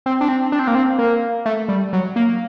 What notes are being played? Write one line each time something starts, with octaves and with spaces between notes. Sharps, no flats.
C4
D4
C4
D4
C4
A#3
C4
A#3
A3
G3
F#3
A#3